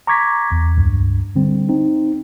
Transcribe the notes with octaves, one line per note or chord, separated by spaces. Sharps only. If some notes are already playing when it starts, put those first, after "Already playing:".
A#5 C#6 D6 G#6 A#6 B6
E2
C#2 G2
D3 G3 C4
C4 D#4